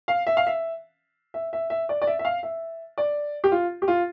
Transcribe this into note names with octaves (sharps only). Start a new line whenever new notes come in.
F5
E5
F5
E5
E5
E5
E5
D5
D5
E5
E5
F5
E5
D5
G4
F4
G4
F4